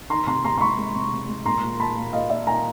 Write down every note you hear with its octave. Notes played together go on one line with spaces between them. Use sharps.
D#3 A#5 C6
C3 A#5 C6
C3 A#5 C6
C6
G#3 B5 C#6
G#3
C3
C3
G#3
A#2 A#5 C6
A#2
A#2 A5 B5
A#2
A#2 D#5 F5
A#2 D5 E5
A#2 G#5 A#5